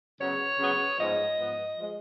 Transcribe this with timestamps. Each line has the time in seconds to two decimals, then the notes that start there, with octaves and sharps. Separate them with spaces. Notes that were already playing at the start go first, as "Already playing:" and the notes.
0.20 C#3 F#3 B3 C#5
0.59 C#3 F#3 B3
0.98 G#2 F3 B3 D#5
1.38 G#2 F3 B3
1.78 F3 G#3